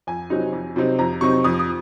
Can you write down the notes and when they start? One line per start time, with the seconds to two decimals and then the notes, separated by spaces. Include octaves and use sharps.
0.07 F2 G#5
0.30 C3 F#3 C4 D#4
0.53 F2
0.76 C3 F#3 C4 D#4
0.99 F2 A#5
1.21 C3 F#3 C4 D#4 C#6
1.44 F2 D#6
1.59 D#6